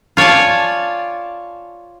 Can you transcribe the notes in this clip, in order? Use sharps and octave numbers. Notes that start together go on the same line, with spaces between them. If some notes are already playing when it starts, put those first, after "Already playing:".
F4 C#5 D5 G#5 A5